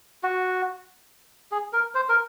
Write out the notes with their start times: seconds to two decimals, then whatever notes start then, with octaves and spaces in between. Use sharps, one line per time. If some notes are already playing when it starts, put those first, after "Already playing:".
0.23 F#4
1.52 G#4
1.73 A#4
1.95 C5
2.09 A#4